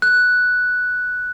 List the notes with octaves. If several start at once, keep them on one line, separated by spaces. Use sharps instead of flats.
F#6